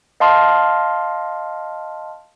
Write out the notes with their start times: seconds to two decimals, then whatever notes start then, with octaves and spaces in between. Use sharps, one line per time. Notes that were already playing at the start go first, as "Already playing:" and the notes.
0.20 D#5 F5 A5 C6 F6